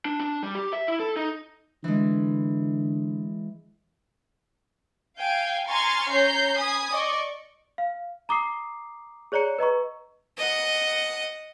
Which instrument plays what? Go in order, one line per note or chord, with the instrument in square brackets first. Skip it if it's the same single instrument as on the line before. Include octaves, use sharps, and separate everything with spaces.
[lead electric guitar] D4
D4
G3
G4
E5
E4
A4
D#4
[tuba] D3 [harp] E3 G#3
[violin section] F5 G5 G#5
G#5 A#5 C6 C#6 F6 A6
C#4 C#5 A#5 G6 C7
G#5 B5 D#6
D5 D#5 C#6
[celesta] F5
A#5 D6 D#6 C7
G#4 C#5 D5 A#5 C#7
B4 D#5 A#5 C#6
[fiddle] D#5 F#5